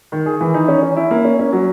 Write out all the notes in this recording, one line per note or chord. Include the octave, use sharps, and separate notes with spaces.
D#3
G#4
E3
D#4
C#4
C#4
E4
A#3
C#4
C#4
F#3